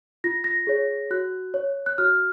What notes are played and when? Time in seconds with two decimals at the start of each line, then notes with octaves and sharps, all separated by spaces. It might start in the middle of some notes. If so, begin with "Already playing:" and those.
0.24 F4 A#6
0.44 A#6
0.67 G#4 C#5
1.11 F#4 F#6
1.54 C#5
1.86 F#6
1.98 F#4 F6